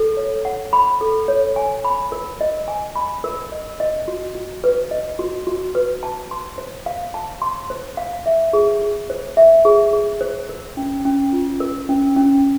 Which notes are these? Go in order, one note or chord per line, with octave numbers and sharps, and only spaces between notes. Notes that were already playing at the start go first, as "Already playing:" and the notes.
Already playing: A4
C#5
F#5
B5
A4
C#5
G#5
B5
A#4
D#5
G#5
B5
A#4
D#5
D#5
F#4
F#4
B4
D#5
F#4
F#4
B4
A5
C6
C5
F5
A5
C6
C5
F5
E5
G#4
G#4
C5
E5
G#4
G#4
C5
A#4
C#4
C#4
F4
A#4
C#4
C#4